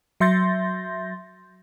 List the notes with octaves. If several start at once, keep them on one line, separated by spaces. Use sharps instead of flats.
F#3 E5 C6 G6 A6 A#6